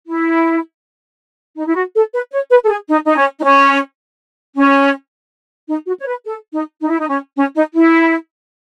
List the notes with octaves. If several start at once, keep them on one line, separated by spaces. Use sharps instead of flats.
E4
D#4
E4
F#4
A4
B4
C#5
B4
A4
G#4
D#4
D#4
C#4
D#4
C#4
C#4
D#4
F#4
C#5
B4
A4
D#4
D#4
E4
D#4
C#4
C#4
D#4
E4